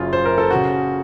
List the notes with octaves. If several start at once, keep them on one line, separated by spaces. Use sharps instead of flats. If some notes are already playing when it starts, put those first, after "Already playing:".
Already playing: F#1 F#2 C#3 F4
C5
A#4
A4
F#4
C#3